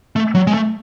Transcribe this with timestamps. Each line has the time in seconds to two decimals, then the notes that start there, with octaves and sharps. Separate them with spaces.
0.16 A3
0.35 F#3
0.47 G#3
0.54 A3